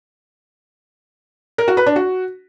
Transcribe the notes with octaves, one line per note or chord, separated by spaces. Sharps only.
A#4
F#4
B4
D4
F#4